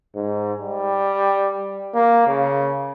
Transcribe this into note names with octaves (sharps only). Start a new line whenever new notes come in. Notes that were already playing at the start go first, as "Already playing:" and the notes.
G#2
G3
A#3
C#3